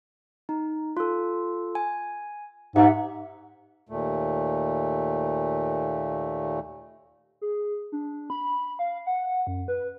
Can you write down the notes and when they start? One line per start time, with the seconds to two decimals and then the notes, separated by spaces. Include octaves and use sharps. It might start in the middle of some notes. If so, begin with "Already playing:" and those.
0.49 D#4
0.97 F4 A4
1.75 G#5
2.76 G#2 G4 E5 F#5
3.89 D#2 A#2 A3
7.41 G#4
7.92 D4
8.30 B5
8.79 F5
9.06 F#5
9.47 F#2
9.68 B4